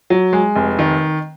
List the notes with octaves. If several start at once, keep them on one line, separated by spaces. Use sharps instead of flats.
F#3
G#3
F1
D#3